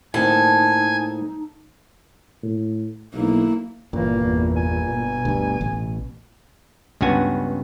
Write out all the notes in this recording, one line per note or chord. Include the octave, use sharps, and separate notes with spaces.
A2 A#3 C4 D#4 A4 G#5
A2
B1 A#3 E4
G1 A#2 E3 A#3
E2
G#5
B2
D2 G2
A1
C#2 G2 B3 F#4 G#5